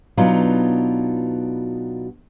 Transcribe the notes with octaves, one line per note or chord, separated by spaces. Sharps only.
B2 F#3 B3 D4 D#4 F4